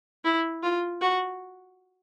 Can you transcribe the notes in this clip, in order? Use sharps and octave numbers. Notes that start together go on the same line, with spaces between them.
E4
F4
F#4